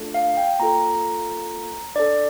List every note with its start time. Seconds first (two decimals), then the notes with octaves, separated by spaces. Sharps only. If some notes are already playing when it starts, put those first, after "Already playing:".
Already playing: A3 D4 F4 A4
0.14 F5
0.37 G5
0.59 A#3 F4 A4 A#5
1.95 D4 A4 D5